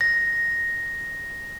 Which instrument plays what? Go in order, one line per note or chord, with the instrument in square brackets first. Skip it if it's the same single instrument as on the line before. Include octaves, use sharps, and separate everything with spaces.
[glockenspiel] A#6